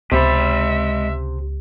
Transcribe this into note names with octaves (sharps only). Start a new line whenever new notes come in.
C#2 C3 G#3 E5 B5